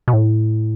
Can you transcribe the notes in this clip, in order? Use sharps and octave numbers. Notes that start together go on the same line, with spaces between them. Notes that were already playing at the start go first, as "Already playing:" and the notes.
B2
A2